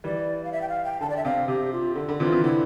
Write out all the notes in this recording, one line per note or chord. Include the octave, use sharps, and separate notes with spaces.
E3 G3 D5
F5
E5
G5
F5
G5
D3 A5
D5
E5
C3 F5
C3 G4
F4
D3 A4
D3
C3 E3 F4
C3 E3
D3 E4